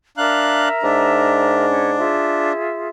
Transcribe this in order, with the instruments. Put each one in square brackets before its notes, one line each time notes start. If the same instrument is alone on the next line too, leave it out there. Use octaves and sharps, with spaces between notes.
[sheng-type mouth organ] D4 F5 F#6 [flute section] A#4 E5 A#5
[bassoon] G#2 [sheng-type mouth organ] D4
[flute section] C#4
F4 G#4 E5